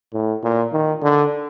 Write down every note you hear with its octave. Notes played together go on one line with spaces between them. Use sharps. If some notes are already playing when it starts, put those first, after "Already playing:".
A2
A#2
D#3
D3